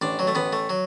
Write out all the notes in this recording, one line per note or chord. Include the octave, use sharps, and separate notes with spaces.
A1 D4
F#3
A3
A1 B3
A3
F#3